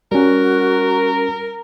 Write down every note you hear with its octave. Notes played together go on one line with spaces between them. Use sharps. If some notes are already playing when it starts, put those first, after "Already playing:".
G3 C#4 F#4 A#4